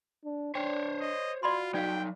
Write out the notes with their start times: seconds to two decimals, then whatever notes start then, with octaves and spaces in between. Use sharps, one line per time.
0.25 D4
0.55 D4 C5 C#5 G5
1.01 D#5
1.43 F4 F#4 D5 B5 C6
1.74 F#3 D#4 D5 F5 G5